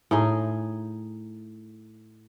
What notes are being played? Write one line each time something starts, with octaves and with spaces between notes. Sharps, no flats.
A2 D#4 G#4